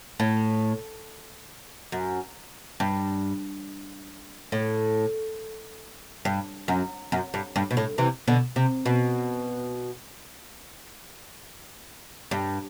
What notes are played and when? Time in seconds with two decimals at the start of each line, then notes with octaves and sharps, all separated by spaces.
0.20 A2
1.92 F#2
2.80 G2
4.52 A2
6.25 G2
6.68 F#2
7.12 F#2
7.34 G2
7.56 G2
7.71 B2
7.77 A2
7.98 C3 E3
8.27 B2 D3
8.56 C3
8.86 B2
12.31 G2